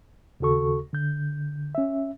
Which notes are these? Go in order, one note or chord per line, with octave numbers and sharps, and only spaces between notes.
D#2 C#3 F#4 A4 C#6
D3 G6
C#4 E5